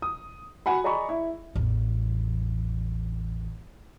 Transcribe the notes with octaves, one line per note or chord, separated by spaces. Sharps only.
D#6
F#4 F#5 G#5 B5
G#4 D5 D#5 A#5 B5 C#6
E4
A1 E2